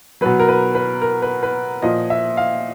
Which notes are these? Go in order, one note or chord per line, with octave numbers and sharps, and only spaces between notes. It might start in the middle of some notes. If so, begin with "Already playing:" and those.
B2 F#3 B4
A#4
B4
B4
A#4
B4
B4
A#2 F3 D#5
E5
F5